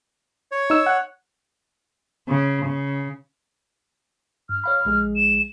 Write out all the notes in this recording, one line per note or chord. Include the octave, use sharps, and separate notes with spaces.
C#5
D#4 E6
F#5
C#3
C#3
G2 F6
C#5 F5 B5 F6
A#1 G#3 G#4
E7